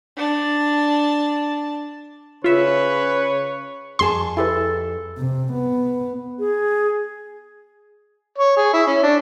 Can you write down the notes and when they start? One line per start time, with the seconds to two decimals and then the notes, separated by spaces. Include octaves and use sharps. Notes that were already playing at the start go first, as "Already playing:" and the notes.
0.17 D4 A5
2.44 C#3 F4 B4 C#5 E5
3.99 F2 G#4 A5 C6
4.37 E4 G4 A4 B4
5.18 C3
5.53 B3
6.39 G#4
8.38 C#5
8.57 G#4
8.73 E4
8.87 C#4
9.03 D4